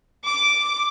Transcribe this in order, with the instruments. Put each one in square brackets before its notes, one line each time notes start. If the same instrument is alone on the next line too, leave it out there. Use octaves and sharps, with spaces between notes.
[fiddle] D6